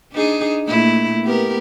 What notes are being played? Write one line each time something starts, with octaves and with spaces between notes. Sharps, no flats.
D4 D#4 G#4
A#2 A3 E4
B3 G4 A#4